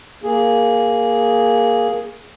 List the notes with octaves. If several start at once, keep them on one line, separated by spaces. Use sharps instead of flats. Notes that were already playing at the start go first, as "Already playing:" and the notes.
A#3 G#4